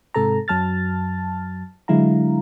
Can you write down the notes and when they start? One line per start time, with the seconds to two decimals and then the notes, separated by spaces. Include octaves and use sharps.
0.14 G#2 C3 A4 A5 A#5
0.48 F#2 F#3 A5 F6 A6
1.88 D3 F#3 G#3 E4 F5 A#5